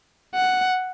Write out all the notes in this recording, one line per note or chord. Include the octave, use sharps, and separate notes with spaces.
F#5